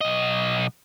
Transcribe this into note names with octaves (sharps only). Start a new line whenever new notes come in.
B1 D#5